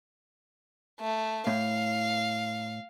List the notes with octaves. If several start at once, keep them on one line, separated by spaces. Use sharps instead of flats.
A3
A2 F5